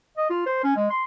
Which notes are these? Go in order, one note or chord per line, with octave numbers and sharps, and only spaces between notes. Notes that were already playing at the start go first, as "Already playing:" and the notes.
D#5
F4
C5
C#4
G#3
C6